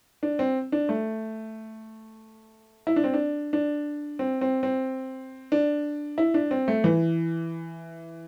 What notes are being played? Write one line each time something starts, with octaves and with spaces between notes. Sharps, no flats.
D4
C4
D4
A3
E4
D4
C4
D4
D4
C4
C4
C4
D4
E4
D4
C4
A3
E3